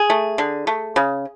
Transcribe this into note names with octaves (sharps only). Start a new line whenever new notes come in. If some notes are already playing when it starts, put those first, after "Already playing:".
Already playing: G#4
A3
D3
A3
C#3